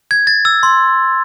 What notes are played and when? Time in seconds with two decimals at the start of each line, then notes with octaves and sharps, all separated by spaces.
0.11 G#6
0.27 A6
0.45 E6
0.63 C6